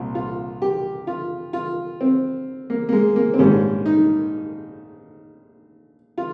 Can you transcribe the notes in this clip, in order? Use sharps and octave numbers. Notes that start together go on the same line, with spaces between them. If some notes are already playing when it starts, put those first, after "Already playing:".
Already playing: C2 A#2
F4
G4
F4
F4
C4
A#3
A#3
G#3
A#3
C4
A#1 G#2 D#3 G3 C#4
D#4
F4